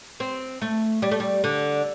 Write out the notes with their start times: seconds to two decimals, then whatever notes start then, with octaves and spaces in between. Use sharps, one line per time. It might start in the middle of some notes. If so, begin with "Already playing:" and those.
0.20 C4
0.61 A3
1.02 G3
1.11 A3
1.20 G3
1.44 D3